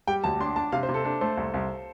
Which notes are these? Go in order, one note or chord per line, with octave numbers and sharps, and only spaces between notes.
G3 G5
D2 A5
D4 C6
D4 A5
C3 F5
C5
C3
A4
D4 A4
A3 C5
C2
C2